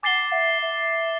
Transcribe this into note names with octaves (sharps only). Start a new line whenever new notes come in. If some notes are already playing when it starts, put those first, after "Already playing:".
F#5 G#5 D6 A6 C7 G7
E5
E5